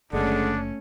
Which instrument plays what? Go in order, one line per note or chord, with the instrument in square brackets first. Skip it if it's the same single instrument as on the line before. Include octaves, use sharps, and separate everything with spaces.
[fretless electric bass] F#1 [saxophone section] D3 G#3 [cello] A3 C#4 [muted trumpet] D4